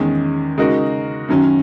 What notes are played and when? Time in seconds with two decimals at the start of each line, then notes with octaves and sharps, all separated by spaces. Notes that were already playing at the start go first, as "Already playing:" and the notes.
Already playing: E2 D#3 G#3 C#4
0.58 C#3 G#3 D#4 F#4 A#4
1.29 F#2 D#3 F#3 C#4